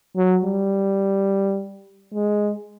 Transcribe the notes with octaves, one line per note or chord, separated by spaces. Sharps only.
F#3
G3
G#3